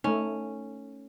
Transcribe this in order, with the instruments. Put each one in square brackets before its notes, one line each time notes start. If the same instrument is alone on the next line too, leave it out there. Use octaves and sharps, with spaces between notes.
[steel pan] A3 D#4 [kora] C#4